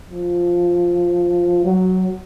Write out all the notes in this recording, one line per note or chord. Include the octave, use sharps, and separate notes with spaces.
F3
F#3